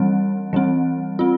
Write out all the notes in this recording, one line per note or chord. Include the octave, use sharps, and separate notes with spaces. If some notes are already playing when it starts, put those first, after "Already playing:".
Already playing: E3 G3 C4
E3 G3 C4
C4 F4